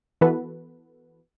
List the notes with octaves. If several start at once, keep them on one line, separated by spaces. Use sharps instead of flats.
E3 B3 F#4 A4 B4